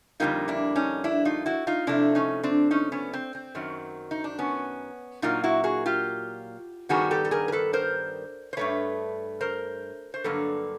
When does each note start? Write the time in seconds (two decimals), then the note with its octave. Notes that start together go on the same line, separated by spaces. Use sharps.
0.20 F2 D3 G3 A#3 D#4 F4
0.48 D4 E4
0.76 C#4 D#4
1.04 D4 E4
1.25 D#4 F4
1.46 E4 F#4
1.67 D#4 F4
1.87 C3 F3 A3 D4 E4
2.15 C#4 D#4
2.43 C4 D4
2.71 C#4 D#4
2.92 B3 C#4
3.14 C4
3.35 C4
3.55 F#2 D#3 F#3
4.11 D#4
4.24 D4
4.39 B3 C#4
5.22 A#2 F#3 A#3 D#4 F4
5.44 E4 F#4
5.64 F#4 G#4
5.86 F4 G4
6.89 G2 D#3 G3 B3 F#4 G#4
7.11 G4 A4
7.25 A4
7.31 G#4 A#4
7.48 A#4
7.52 A4 B4
7.73 A#4 C5
8.53 C5
8.57 G2 E3 A3 B4 C#5
9.41 A#4 C5
10.14 C5
10.24 G2 D3 F#3 A#3 A4 B4